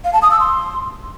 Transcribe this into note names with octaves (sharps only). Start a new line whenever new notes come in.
F5
A5
D#6
E6
C6